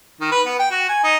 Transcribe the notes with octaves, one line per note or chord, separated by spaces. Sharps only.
D#3
B4
B3
G5
F#4
G#5
D#4